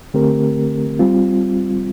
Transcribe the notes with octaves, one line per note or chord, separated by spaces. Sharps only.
D3 A3 C4 G4 A#4
G3 C4 F4